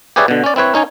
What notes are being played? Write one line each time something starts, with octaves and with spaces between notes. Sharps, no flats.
G4 G#4 B4 C#5 D5 E5
B2 D3
C#4 D5
C4 E4 B4 C#5
C#4 D#4 C#5 G#5